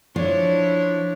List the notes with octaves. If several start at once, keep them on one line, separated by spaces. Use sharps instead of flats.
F3 D4 E4 C#5